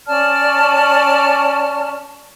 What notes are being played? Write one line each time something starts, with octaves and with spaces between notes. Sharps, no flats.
C#4 D5 A5 F6